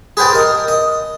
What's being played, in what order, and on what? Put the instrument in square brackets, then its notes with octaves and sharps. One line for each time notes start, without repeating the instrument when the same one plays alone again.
[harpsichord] G#4 B4 C5 G5 A5
A#4 D#5
D#5